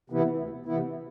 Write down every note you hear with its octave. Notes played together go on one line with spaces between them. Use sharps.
C3 E3 B3 E4
D2
C3 E3 B3 E4